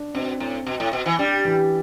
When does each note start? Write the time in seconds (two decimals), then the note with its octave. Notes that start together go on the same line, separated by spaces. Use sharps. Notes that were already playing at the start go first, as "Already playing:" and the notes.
Already playing: D4
0.14 B2 C4
0.40 A2
0.67 B2
0.80 A2
0.93 B2
1.06 E3
1.18 G3 D4
1.45 E3